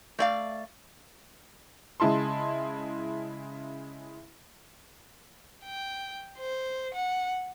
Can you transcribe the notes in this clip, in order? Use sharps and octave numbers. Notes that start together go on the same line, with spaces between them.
A3 D5 F5
C#3 G#3 E4 A5 C6
G5
C5
F#5